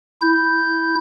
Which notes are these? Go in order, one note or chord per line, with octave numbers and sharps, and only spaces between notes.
E4 G6